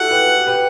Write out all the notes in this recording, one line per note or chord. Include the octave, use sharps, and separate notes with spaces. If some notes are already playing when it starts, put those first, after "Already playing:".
Already playing: E4 F#4 G4 A4 F#5
G4 B4
G4 B4